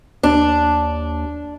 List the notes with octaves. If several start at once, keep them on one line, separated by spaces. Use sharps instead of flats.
D#2 D4